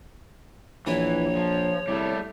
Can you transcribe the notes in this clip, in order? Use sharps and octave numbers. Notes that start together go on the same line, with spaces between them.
A#1 E3 C#5
F3
C2 G3 A3